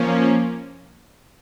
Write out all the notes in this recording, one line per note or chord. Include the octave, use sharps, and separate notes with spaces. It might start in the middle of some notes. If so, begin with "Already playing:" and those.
Already playing: F3 A#3 C#4